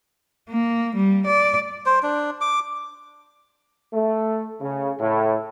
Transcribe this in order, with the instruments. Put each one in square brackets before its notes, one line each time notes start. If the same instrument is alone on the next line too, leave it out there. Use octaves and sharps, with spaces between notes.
[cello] A#3
G3
D5
[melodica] C5
D4
D6
[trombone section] A3
C#3
A2